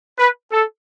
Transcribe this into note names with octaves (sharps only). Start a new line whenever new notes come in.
B4
A4